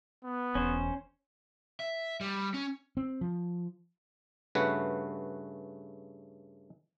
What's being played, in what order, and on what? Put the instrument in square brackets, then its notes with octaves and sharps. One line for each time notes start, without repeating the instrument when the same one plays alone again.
[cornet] B3
[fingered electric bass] E1 E2 [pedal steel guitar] C#4 C5
[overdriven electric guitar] E5
G3
C#4
[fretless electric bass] C4
F3
[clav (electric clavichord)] G2 C#3 A3 F#4 B4 F#5